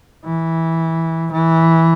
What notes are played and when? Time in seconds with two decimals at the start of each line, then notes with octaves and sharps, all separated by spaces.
0.25 E3
1.32 E3